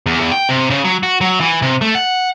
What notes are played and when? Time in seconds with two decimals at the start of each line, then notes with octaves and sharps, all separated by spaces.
0.06 E2
0.20 E2
0.32 G5
0.49 C3
0.70 C#3
0.84 F#3
1.03 F#4
1.21 F#3
1.41 E3
1.62 C3
1.81 A3
1.95 F#5